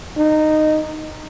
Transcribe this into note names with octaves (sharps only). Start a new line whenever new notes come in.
D#4